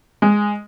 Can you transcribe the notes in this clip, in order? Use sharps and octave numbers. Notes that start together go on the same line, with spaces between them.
G#3